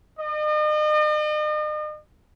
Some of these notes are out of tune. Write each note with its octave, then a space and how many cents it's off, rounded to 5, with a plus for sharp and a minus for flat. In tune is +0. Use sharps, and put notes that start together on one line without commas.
D#5 -40